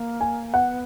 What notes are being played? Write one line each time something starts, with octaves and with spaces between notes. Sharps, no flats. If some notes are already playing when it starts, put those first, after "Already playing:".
Already playing: A#3
G#5
B3 F#5